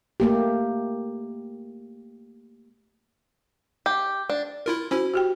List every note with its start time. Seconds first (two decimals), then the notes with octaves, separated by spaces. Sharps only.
0.20 A3 A#3 G4
3.86 G4
4.30 D4
4.66 E4 F4 A#4
4.91 C#4 E4 F#4 C5
5.14 F#4 G4 G5